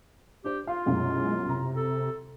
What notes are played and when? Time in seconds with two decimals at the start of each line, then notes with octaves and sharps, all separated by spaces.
0.44 D4 G4 C5
0.67 F4 F5
0.86 C2 F#2 B2 G#3
1.49 C3 A#5
1.75 A4